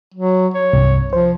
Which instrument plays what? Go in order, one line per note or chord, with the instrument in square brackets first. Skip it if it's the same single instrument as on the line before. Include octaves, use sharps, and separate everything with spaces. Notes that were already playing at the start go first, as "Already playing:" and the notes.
[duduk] F#3
C#5
[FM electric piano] C2 G2
[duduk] F3 [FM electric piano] C5